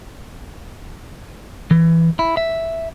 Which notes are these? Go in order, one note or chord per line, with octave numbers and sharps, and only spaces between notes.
E3
E4
E5